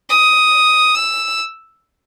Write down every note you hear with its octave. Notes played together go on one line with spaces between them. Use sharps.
D#6
E6